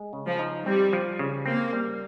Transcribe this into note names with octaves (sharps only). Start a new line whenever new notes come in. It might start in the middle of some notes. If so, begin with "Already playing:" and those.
Already playing: G#3
C#3
F3
D#4
G3 C4
F3
C#3
A#3 C4
G3